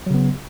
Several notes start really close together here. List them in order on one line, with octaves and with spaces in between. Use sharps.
F#3 C#3 B3